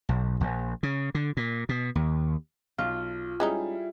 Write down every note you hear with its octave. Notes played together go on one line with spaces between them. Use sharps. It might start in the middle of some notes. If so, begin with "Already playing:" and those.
B1
A#1
C#3
D3
A#2
B2
D#2
B1 F4
G3 G#3 C#4 D#4 E4 G#4